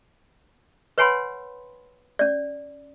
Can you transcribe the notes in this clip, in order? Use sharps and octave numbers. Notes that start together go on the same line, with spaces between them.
B4 C#5 F#5 G#5 B5 C6
C#4 D5